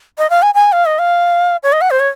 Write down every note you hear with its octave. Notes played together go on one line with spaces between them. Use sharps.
D#5
F5
G#5
G#5
F5
D#5
F5
C#5
D#5
F#5
C5
C#5